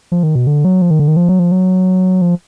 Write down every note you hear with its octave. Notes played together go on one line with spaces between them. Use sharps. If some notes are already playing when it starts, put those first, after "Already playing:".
F3
D#3
B2
D3
F#3
F3
D#3
D3
D#3
F3
F#3
F3
F#3
F3